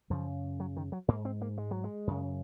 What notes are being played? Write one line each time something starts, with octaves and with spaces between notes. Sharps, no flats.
F#2 C#3 F3
F#3
D#3
F#3
G#2 A#3
C4
A#3
G#3
F#3
G#3
F#2 C#3